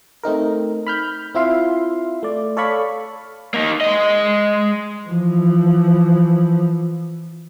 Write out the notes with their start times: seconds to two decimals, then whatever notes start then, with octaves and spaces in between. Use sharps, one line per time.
0.24 A3 C4 D#4 A#4
0.87 B5 F6 G6
1.35 C4 E4 F4 E5 F5 C6
2.23 A3 D5
2.57 A4 C#5 D5 F5 B5 C#6
3.54 A#3 D#4
3.81 G#3 D#5
5.08 E3 F3